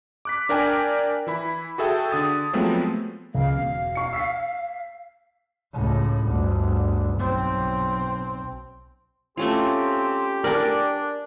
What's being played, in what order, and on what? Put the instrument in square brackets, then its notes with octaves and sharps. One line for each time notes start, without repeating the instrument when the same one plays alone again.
[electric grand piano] D6 F#6 B6
D4 A#4 D5 G5 G#5 D6
E3 E4 B5
F#4 G#4 A4 E5 G5
D3 D#6 A6
F3 F#3 G#3 A3 B3 C4
[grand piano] C#2 [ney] F5
[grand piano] E1
C#6 C#7
E6 B6 C7
[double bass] C#2 A2
G1 D2
B1 C4
[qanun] A3 C#4 F4 [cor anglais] C4 [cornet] G4
[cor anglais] D4 [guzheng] A#4 [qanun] D5 G#5